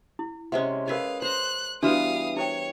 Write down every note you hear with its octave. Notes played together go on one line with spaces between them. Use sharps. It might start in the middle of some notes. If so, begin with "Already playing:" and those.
E4
C3 G#3 C#4 C5 D#5 F#5
G#4 A#4 B4 D#5 F5
C5 A#5 F#6
E3 G3 B3 D4 F#4 B4 F5 D#6
E4 C5 C#5 G5